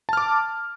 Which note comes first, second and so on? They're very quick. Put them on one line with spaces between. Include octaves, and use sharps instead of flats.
A5 F6 D6